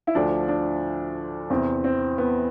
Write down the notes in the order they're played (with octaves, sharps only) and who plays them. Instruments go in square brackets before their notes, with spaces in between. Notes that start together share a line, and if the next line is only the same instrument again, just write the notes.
[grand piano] E4
D2 D3 F3 D4
D4
E2 C3 E3 C4
C4
B3